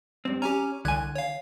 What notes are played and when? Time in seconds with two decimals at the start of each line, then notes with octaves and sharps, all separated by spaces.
0.25 G2 C4
0.42 C#4 G4 G#5 A#5
0.85 C2 D3 G#5 F#6 G#6
1.15 C#5 F5